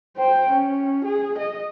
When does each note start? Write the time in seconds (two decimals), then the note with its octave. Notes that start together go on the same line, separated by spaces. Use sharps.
0.17 C5 G5
0.50 C#4
1.05 G#4
1.39 D#5